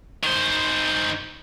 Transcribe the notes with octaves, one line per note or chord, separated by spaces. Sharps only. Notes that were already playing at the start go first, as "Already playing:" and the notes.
D#3 C5